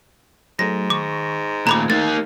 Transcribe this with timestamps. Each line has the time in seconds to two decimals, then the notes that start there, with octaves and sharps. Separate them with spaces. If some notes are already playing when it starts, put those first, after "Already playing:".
0.59 G#2 F#3 A3 A#6
0.90 D#3 C#6 D6 A#6
1.67 D#2 A#2 A3 A#5 B5 D6 G#6
1.90 A#3 D#4 A6